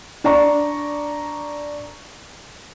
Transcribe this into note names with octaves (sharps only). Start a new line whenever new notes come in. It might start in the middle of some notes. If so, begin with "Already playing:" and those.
D4 D5 A#5 C#6